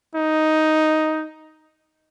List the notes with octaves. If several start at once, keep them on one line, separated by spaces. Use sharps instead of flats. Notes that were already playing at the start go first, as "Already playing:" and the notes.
D#4